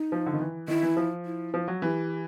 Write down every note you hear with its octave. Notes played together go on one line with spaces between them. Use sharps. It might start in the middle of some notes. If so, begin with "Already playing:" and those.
Already playing: D#4
F3
D3
D#3
E3
D#3 E4
E3
F3
E4
F3
F#3
E3 G4